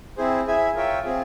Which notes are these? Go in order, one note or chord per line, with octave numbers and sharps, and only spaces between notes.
C4 E4 G#4 C5
E4 G#4 E5 G#5
F4 A#4 C#5 E5 G5
C4 F4 G#4